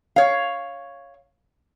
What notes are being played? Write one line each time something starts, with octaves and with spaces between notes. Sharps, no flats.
C#5 F5